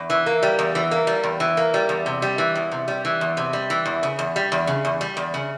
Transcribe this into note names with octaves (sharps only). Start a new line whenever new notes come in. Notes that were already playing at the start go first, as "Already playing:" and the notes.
Already playing: E2
E3
A#3
G3
E2
E3
A#3
G3
E2
E3
A#3
G3
E2
C3
G3
E3
E2
C3
G3
E3
E2
C3
G3
E3
E2
C#3
E2
G3
E2
C#3
E2
G3
E2
C#3